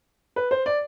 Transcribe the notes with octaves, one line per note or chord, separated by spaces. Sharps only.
B4
C5
D5